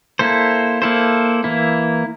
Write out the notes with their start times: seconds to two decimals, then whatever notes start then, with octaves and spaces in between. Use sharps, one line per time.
0.19 A#3 E4 A4 C5
0.82 A#3 E4 A4 C5
1.44 E3 A#3 E4